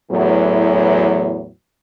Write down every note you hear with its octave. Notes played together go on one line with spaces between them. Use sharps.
E2 A2 E3 F#3